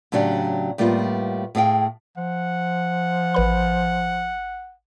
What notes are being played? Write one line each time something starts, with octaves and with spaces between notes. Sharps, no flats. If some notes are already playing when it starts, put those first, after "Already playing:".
A2 C#3 F#3 D4 G4
A2 G3 A#3 B3 F4
A2 G#4 F5 G5
F3 F#5
A1 B4 B5